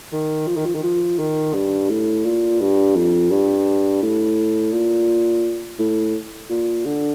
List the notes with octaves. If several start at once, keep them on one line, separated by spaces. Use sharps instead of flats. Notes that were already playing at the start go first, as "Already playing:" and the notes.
D#3
F3
D#3
F3
D#3
F3
D#3
G2
A2
A#2
G2
F2
G2
A2
A#2
A2
A#2
D3